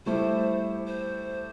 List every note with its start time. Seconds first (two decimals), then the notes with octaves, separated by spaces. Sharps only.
0.06 G3 A3 E4 C5
0.87 C5